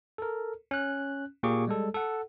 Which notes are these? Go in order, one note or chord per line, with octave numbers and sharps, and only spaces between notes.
A4 A#4
C#4 F#6
A#2 A#3 G4 G#4 C#6 D6
G3 G#3 A4
A4 F#5